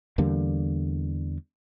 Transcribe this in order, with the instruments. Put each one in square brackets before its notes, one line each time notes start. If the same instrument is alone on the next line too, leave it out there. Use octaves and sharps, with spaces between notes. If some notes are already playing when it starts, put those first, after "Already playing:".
[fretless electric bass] E2 D3 G3 A#3